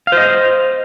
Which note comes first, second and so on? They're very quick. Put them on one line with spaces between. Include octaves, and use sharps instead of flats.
F5 C5 D#5